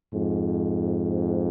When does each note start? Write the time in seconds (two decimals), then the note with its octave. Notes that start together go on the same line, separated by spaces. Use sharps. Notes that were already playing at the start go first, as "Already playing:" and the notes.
0.12 F2 G#2